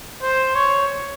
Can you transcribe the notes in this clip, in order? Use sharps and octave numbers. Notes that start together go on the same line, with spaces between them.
C5
C#5